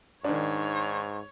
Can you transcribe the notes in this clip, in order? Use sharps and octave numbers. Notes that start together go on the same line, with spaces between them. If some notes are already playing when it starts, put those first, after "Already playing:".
G#2 D#3 D4 C#5